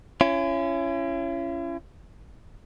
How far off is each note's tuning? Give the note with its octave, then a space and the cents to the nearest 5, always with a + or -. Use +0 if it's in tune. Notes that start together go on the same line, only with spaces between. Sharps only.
C#4 +0 E4 +45